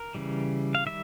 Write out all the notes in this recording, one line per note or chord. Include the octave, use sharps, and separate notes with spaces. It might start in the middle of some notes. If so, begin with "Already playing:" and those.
Already playing: A#4
C#3 E3 G3
F5
D#3 G3 E5